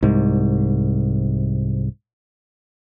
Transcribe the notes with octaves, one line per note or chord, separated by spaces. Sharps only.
C2 G#2